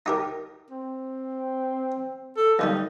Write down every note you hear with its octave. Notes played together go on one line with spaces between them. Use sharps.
D#4 G4 A#4
C4
A4
D#2 D#3 G3 D#4